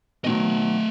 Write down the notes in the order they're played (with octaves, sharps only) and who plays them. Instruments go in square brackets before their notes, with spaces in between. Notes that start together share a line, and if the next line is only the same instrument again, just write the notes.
[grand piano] B2 D#3 F#3 [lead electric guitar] A3 D#5